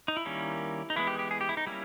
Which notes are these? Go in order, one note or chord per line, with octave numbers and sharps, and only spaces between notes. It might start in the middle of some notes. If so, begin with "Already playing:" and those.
D#4
E4
D#3 G3 A#3 C#4
D#4
E3 G#3 B3 E4
G4
G4
G#4
G4
E4
D#4
G3 A#3 C#4 E4